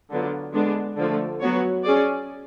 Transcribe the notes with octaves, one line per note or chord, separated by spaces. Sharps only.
D3 F#3 B3 F4
D3 G#3 B3 D4
D3 F3 A3
F#3 B3 F#4 C#5
C#4 G#4 D5